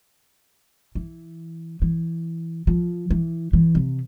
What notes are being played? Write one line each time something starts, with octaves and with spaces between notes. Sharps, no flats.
E3
E3
F3
E3
E3
C3